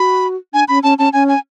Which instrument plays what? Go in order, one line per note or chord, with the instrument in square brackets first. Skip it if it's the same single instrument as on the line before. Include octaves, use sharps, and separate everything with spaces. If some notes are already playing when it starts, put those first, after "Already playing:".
Already playing: [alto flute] F#4 [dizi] B5
[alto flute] D4 [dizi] G#5
[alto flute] C#4 [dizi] B5
[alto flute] C#4 [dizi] A5
[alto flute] C#4 [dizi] A5
[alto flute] C#4 [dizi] G#5
[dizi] G#5